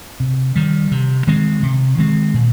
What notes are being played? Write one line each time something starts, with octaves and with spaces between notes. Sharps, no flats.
C3
D#3 G3
C3
D#3 G#3 C4
C3
D#3 G#3 C4
A#2